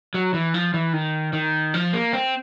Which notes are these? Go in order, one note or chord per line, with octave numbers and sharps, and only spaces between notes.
F#3
E3
F3
E3
D#3
D#3
F3
A#3
C4